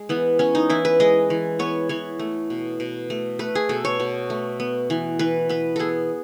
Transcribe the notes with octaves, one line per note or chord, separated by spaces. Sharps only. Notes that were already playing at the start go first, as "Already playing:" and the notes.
Already playing: G#3
E3 B3
B3 C#4
D#4
E3 E4
B4
G#3 D#5
E3
B3 C#5
E3 C#5
A3
B2
B2
A3
A3 B4
G#4
B2 A4
C#5
B2
A3
B3
E3
E3 B4
B3 B4
B3 G#4 A4